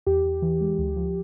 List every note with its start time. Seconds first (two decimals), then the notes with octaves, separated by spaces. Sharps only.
0.06 E2 G4
0.25 E2
0.42 E3
0.61 G#3
0.78 D2
0.96 F3